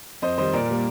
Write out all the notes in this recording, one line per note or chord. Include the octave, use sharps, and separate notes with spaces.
F2 C5 D#5
D#3 G3 C5 D#5
A#2 A#4 D5
G3 A#3